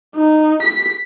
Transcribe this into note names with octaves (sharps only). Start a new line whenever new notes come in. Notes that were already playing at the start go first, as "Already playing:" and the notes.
D#4
B6